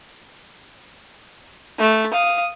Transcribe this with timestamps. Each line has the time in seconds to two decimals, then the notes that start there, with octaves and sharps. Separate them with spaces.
1.79 A3
2.13 F5 D#6